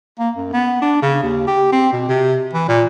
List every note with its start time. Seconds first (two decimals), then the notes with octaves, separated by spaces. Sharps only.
0.19 A#3
0.36 F#2
0.53 B3
0.82 D4
1.02 C#3
1.23 D#2
1.47 G4
1.72 C4
1.92 B2
2.08 C3
2.54 E3
2.68 A#2